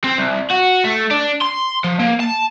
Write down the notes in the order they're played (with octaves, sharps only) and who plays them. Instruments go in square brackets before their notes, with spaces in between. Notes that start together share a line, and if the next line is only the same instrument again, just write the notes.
[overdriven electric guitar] C4
C2
F#4
A3
D4
C6
F3
A#3
A5